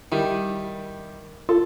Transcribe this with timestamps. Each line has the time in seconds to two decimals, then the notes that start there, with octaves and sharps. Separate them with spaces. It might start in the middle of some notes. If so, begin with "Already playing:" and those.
0.12 D#3 G3 E4
1.49 F4 A4